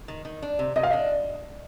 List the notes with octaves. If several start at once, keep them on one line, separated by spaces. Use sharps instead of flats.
D#3
D#3
D4
C3
C3 D#5
F5
D4 D#5